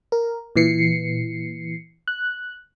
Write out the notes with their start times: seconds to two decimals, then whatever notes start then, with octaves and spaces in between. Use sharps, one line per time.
0.12 A#4
0.56 A#2 E3 C7 C#7
2.08 F#6